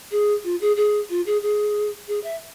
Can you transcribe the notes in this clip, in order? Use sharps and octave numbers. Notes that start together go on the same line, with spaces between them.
G#4
F4
G#4
G#4
F4
G#4
G#4
G#4
E5